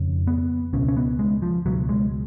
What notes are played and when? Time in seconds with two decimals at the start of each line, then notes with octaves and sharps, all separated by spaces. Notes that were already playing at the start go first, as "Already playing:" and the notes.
Already playing: F2 C#3
0.27 B3
0.73 C#2 B2 C#4
0.88 C#4
0.97 B3
1.19 G#3
1.42 F3
1.65 C#2 B2 F#3
1.89 G#3